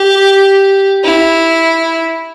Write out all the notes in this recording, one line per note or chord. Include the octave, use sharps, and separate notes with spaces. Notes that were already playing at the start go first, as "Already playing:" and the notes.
Already playing: G4
E4